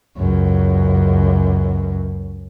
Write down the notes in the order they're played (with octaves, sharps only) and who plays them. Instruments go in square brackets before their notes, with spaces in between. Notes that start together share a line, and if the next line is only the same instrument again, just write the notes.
[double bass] C#2 F#2